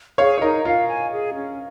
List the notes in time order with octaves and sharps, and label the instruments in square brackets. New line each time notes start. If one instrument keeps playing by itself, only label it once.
[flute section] G#4 [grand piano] C#5 F5
[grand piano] C#5
[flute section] D#4 [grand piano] A#4 D#5
[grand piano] F4 A#4 [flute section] F5
[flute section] G#5
G#4
C#4